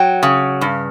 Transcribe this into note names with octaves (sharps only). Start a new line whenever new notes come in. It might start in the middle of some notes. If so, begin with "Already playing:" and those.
Already playing: F#3 G5
C#3
G2